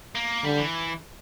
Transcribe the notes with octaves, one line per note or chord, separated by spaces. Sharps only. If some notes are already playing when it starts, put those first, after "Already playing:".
A#3
D3 G3
E3